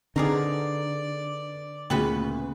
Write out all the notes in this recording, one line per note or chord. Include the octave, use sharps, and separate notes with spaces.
D3 C4 D#4 G#4 B4 D5 F5 A#5
D2 A#2 C#3 B3 B4 F#7